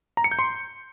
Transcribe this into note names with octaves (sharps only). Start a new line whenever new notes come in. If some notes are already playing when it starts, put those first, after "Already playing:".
A#5
C#7
G6
C6